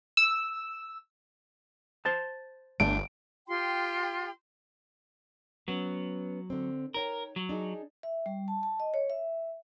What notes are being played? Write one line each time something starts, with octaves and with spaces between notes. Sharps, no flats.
E6
C5 A5
G1 A3 D4 D7
F4 G4 G5 C6
F#3 B3 C#4
D3 C4
D#4 A#4 C#5 G5
F#3
D4 D#4 G#4
E5
G3
A5
A5
D#5
C#5
E5